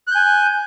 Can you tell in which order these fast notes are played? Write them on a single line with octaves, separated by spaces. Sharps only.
F#6 G6 G#5